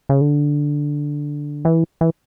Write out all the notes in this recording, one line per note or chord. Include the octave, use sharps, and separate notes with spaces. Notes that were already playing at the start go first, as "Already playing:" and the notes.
C#3
D3
E3
E3